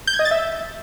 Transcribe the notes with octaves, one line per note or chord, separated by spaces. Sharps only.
G6
G#6
D#5
A6
E5